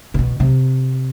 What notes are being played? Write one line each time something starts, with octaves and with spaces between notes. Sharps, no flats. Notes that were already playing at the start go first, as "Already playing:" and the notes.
C3
B2
C3